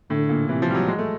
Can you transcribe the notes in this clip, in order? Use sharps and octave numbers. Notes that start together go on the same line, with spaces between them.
A2 D3
A#2
C3 E3
F3
G3
F#3
G#3
A3